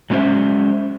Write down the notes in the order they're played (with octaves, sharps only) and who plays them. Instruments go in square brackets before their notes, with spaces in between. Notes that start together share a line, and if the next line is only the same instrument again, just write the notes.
[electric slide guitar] F#3 G#3 A3 C#4 C5 E5